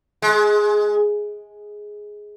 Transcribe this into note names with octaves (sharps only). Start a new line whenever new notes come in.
G#3